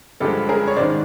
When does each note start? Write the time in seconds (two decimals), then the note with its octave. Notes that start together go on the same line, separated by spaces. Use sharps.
0.20 G2 D3 F3 G#3 G4 A4
0.49 G#4 A#4
0.67 C#5
0.77 G#2 D#3 G#3 C5 D5